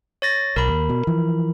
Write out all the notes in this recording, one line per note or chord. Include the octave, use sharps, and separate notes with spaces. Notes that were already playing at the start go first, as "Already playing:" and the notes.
C#5 A6 A#6
B1 A#4 B5
D#2
B2
E3 F3